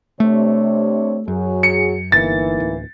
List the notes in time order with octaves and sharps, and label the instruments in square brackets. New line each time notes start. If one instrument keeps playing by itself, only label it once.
[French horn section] C3 D4 C#5 [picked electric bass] A3
[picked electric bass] F#2 [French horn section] F#3 G#4
[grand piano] C#7
[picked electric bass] G1 [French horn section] E3 A#3 D#4 [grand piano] A6
[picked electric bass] D1